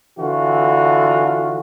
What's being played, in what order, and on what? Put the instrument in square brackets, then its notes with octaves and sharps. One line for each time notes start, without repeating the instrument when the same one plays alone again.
[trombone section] D3 E3 F4 F#4